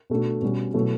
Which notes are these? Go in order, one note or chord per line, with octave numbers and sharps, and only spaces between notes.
B2 A3 D4 F#4
B2 G3 C#4 F#4
B2 F#3 A3 E4